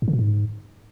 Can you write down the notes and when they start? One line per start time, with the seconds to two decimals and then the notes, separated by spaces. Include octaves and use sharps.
0.02 G#2
0.08 D3
0.13 A#2
0.19 G#2